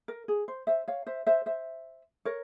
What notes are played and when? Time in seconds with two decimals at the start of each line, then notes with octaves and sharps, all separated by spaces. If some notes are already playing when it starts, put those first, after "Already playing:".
0.08 A#4
0.28 G#4
0.48 C5
0.67 C5 E5
0.88 C#5 F5
1.07 C5 E5
1.27 C5 E5
1.46 C5 E5
2.25 A#4 C#5